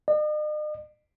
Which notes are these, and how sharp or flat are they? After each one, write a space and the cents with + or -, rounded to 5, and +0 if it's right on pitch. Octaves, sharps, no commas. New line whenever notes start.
D#5 -45